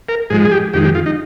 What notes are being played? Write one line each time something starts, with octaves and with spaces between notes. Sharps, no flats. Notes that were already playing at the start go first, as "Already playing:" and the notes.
A#4
G#2 F3 G#3 G#4
G#4
G4
F2 D#3 G#3 G4
G4
F4
D#4